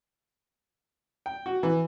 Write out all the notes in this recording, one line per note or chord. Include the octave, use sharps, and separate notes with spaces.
G5
F#4
E3